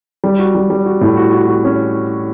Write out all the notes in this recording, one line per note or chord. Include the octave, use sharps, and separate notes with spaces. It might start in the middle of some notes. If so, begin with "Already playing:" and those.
G3
F#4
G3
G3
F#4
A2
F#4
F#4
F#4
C#4